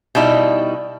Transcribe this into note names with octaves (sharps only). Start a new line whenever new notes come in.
B2 G3 D#4 E4